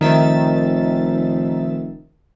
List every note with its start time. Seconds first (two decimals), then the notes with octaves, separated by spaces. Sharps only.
0.01 F1 D#3 E5 A6